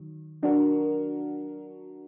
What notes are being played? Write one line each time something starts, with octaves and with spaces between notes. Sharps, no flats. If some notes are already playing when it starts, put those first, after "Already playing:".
Already playing: D#3 F#3
F#3 D4 F#4 A#4